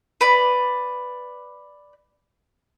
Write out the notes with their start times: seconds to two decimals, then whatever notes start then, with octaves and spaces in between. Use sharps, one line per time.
0.21 B4 D5